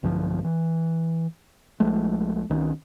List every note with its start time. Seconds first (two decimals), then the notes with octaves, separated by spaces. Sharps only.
0.03 B1 G2 D3 F3
0.44 E3
1.80 A#1 F3 G#3 A3
2.50 C2 D#3 F3 C#4